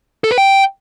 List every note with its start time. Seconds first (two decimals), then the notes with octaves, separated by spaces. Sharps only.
0.24 A4
0.31 B4
0.38 G5